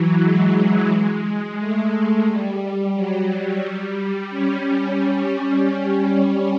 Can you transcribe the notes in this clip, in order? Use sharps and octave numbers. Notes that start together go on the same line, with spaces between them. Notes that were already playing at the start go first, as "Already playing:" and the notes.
Already playing: E3 F#3
G#3
A3
G3
G3
F#3
G3
C#4